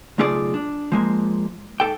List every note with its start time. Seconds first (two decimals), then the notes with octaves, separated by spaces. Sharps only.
0.18 B1 C#3 A3 F4 G#4 D5
0.54 D4
0.92 F3 G#3 A#3
1.80 G#2 A4 G5